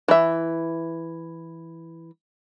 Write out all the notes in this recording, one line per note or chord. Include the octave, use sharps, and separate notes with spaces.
E3 E5